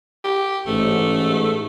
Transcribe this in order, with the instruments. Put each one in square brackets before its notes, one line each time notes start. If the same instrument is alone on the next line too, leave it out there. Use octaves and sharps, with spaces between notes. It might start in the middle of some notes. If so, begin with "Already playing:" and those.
[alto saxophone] G4
[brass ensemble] A1 G#2 [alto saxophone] A3